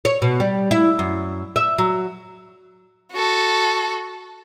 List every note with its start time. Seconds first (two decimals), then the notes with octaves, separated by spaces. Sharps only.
0.05 C#5
0.22 B2
0.40 G3
0.71 E4
0.99 F#2
1.56 E5
1.78 F#3
3.12 F#4 A4